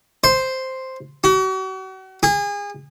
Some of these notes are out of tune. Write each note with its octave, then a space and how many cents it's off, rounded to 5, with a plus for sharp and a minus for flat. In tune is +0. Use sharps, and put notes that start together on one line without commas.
C5 +0
F#4 +40
G#4 -30